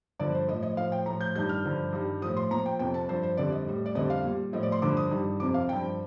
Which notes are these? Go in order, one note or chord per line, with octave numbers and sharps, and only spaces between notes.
G2 D3 F3 D5
C5
A2 F3 D#5
D#5
A2 F3 F5
G5
A2 F3 A#5
G6
G2 D#3 G3 G6
F6
G2 D3 F3
G2 D#3 G3
A2 F3 D#6
C6
A#2 F3 A#5
G5
F2 C3 F3 G5
A5
G2 F3 C5
C5
F2 D3 G3 D5
D#5
A2 G3
D5
F2 D3 G3 D#5
F5
A#2 G3
A2 F3 D#5
D5
C6
G2 D3 F3 D6
D#6
G2 D#3 G3
F2 C3 F3 D6
F5
G2 F3 G5